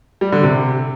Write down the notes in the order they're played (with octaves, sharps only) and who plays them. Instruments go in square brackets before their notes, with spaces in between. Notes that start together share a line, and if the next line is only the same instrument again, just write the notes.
[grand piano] G3
D3
C3